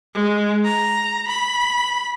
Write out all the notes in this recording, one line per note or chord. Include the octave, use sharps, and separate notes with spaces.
G#3
A#5
B5